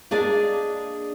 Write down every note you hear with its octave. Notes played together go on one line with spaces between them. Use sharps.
A#3 D4 G#4 D5 D#5 A5